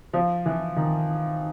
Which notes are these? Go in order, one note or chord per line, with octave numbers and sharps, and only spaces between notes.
F3
E3
D#3